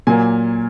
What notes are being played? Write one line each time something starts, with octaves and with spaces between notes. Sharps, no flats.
A#2 F#3 A#3 G#5